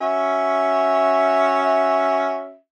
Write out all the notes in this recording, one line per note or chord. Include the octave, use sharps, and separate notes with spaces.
C#4 F#4 E5